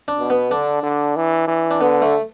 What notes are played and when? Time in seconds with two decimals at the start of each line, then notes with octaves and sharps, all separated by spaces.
0.08 D4
0.19 B2
0.30 B3
0.51 D3 D4
0.83 D3
1.16 E3
1.48 E3
1.71 D4
1.81 D3 B3
2.02 A3